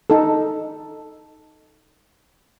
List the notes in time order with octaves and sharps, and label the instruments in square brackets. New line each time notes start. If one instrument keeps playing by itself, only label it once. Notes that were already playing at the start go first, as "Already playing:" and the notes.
[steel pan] D#4 A4